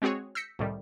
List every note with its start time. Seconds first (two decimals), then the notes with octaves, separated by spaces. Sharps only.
0.02 G#3 C4 F#4 G#4 C#5
0.35 E6 G6 A#6 B6 C#7
0.59 C2 A2 D#3 G3